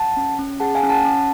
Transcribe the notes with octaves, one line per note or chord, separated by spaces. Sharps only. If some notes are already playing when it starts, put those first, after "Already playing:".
Already playing: F#5 A5
C#4
C#4
G#4 F#5 A5
F5 G#5
C#4
F#5 A5
C#4